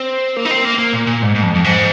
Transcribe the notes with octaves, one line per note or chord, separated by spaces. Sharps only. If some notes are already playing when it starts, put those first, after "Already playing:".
Already playing: C4
A#3
D#4
C4
A#3
A#3
A#2
A#2
G#2
G#2
F2
F2
G#2